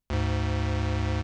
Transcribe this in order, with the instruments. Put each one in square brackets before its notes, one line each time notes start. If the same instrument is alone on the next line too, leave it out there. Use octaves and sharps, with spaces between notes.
[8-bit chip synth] D2 G#2